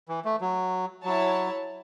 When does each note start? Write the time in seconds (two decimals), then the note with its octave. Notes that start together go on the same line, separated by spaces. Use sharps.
0.09 E3
0.25 A3
0.41 F#3
1.05 F#3 E4 C#5 A5